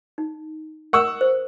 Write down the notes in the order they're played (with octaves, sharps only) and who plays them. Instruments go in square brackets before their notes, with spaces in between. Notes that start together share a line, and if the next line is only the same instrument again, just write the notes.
[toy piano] D#4
[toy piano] A#4 D#6 [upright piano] F#5 C#6 E6
[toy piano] C5